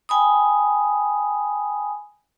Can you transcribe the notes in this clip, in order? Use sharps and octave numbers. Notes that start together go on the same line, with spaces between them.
G5 G#5 B5 D#6